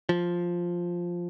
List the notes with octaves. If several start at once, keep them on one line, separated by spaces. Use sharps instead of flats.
F3